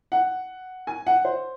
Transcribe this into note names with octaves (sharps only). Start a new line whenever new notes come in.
F#5
G#5
F#5
C5